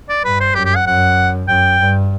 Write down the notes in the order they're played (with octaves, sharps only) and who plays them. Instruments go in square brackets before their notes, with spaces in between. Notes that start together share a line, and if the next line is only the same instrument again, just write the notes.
[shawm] D5
[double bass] G2 [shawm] B4
[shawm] C5
[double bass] F#2 [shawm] G4
[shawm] G4
F#5
[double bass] F#2 [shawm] F#5
[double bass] F#2 [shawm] G5
[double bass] G2